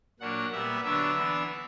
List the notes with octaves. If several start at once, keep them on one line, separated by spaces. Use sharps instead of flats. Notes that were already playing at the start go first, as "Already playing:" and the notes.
A#2 F#3 A#3 D4 F#5
A#2 G3 B3 E5
D3 F#3 B3 D4 E5
E3 B3 D4